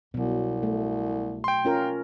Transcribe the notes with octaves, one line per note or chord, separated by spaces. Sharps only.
C2 B2 F#3
A3
G5 C6
C#4 F4 A#4